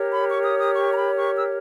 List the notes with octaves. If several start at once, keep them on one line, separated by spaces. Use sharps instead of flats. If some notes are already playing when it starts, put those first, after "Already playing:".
Already playing: G4 A#4 C#5
B5
C#6
D#6
D#6
C#6
A#5
B5
C#6
E6